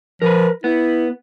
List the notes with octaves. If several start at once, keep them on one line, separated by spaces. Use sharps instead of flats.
F3 A#4 B4
B3 E4